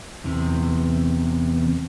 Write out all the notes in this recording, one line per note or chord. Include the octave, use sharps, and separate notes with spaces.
E2 C3